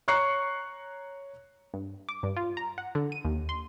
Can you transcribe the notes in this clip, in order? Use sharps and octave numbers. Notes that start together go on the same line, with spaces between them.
C#5 A#5 C#6 F#6 C7 C#7
G2
D6
G2
F4
A#5
F#5
D3
D#7
D#2
C6